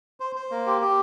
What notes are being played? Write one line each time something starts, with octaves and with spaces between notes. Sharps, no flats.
C5
C5
A#3
G4
G4